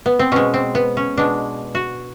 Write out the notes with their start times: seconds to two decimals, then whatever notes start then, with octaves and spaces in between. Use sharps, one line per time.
0.06 B3
0.19 C4
0.32 B2 G#3 C#4
0.54 C4
0.75 B3
0.97 C#4
1.17 B2 G#3 D4
1.75 F#4